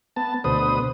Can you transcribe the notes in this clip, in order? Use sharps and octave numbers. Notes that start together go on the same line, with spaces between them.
B3 A5
D2 B2 B4 C5 D#6